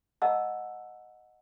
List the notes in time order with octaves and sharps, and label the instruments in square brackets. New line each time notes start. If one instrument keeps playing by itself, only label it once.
[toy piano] D#5 F#5 A5 A#5 E6